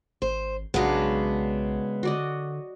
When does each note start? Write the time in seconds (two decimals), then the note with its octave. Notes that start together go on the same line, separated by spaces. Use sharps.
0.22 G#1 C5
0.74 B1 C#3 F#3 G#3 B3 D4
2.03 D3 F#4 D5 D#5